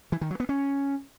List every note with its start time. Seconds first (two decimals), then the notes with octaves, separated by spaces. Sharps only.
0.12 E3
0.21 D#3
0.31 F#3
0.40 B3
0.49 C#4